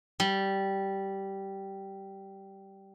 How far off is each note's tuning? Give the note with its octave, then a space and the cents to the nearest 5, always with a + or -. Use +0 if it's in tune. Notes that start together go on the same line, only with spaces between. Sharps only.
G3 -10